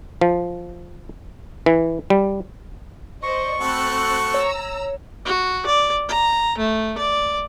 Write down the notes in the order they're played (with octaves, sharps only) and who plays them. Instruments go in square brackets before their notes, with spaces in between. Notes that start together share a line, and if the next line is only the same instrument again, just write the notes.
[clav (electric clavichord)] F3
E3
G3
[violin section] C5 D5 D#5 [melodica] C#6
[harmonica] A3 F#4 A4 [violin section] C4 B5 F#6
[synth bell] C#5 [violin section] A#5 E6
[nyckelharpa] F#4
D5
A#5
A3
D5